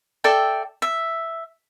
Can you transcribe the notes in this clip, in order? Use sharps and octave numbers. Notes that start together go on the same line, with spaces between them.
A4 D5 E5 G5
E5